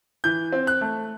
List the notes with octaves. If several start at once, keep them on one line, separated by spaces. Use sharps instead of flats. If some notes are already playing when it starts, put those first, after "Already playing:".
E3 G6
C4
F#6
A3